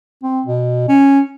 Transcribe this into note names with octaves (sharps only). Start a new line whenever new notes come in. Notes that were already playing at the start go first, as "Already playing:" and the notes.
C4
B2
C#4